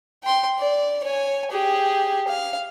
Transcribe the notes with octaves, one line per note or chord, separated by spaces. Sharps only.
G5 C6
D5
C#5 G#5
G4 G#4
F5